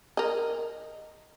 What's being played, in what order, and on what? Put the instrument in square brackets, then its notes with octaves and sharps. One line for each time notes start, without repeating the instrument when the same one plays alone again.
[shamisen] A#4 D#5